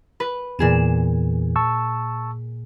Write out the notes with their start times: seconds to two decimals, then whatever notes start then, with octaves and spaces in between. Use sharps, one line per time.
0.20 B4
0.59 E2 A#2 E3 G#4 E7
1.56 A5 C#6 E6